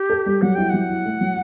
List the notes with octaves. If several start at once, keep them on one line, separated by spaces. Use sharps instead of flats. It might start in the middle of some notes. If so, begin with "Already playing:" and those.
Already playing: G4
A4
G3
F#3 F#5
E4 G5
F#3 F#5
E4
A3
F#3